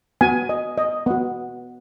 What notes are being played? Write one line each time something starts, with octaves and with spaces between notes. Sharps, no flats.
B3 F#4 G#5
D#5
D#5
B3 F#4 F#5